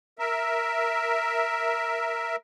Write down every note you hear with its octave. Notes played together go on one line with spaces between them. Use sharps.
A#4 E5